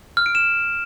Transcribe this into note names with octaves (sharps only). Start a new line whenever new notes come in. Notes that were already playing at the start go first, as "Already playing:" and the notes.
F6
D7
E7